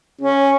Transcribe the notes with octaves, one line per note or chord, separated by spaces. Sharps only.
C#4